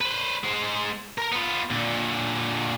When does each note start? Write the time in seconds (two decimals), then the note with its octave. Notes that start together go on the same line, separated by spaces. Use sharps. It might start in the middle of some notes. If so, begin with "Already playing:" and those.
0.01 B4 C5
0.44 G#3 C5
1.18 A#4 A#5
1.32 B3 F4
1.71 A#2 D3